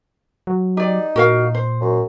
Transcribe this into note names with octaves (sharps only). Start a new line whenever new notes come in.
F#3
D#4 G4 D5
A#2 F#4 A#4 F5
C5
F#2